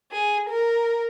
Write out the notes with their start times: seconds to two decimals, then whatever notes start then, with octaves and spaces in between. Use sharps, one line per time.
0.12 G#4
0.49 A#4